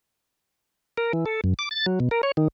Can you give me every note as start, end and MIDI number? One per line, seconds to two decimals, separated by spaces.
0.98 1.12 70
1.13 1.25 52
1.26 1.41 69
1.44 1.54 42
1.59 1.69 86
1.71 1.86 93
1.86 1.99 54
2.00 2.09 47
2.11 2.21 70
2.23 2.32 73
2.37 2.48 51